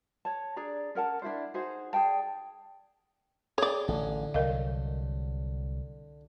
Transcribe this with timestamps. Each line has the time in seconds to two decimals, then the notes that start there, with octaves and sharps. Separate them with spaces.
0.25 C#5 A5
0.56 D4 G#4 D5 A#5
0.95 C#4 A#4 F#5 A5
1.22 D4 E4 F4 C5
1.54 D#4 F#4 G#4 C5
1.93 G#4 D5 G5 A5
3.58 G#4 C#5 D5 G5
3.88 A1 D3
4.34 C2 F#3 A#4 D#5 F5